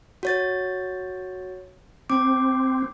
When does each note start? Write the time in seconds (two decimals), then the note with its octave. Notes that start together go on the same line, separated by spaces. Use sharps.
0.23 F#4 C#5 A6
2.10 C4 D6